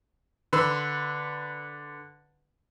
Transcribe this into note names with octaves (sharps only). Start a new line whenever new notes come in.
D3 B4 B5 C6 E6